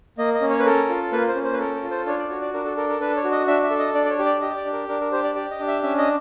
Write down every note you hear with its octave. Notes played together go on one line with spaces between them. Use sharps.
A#3 D#5
D#5
C#4
C#5
B4
A4 A#4
F4
A#3 B4
C5
C#4
C5
B4
A4 A#4
A#4
F4
C5
D4 C#5
D5
F#4 C#5
D5
D4 A#4
A4
A4 A#4
A#4
D4 B4
C#5
F#4
D#5
D4 E5
E5
A4
D#5
D4 D5
D5
C#5
G4
D5
G4 D#5
D5
D4
A#4
D4 A#4
A#4
G4 C5
D5
G4 D5
D#5
D4
E5
C#4 E5
D#5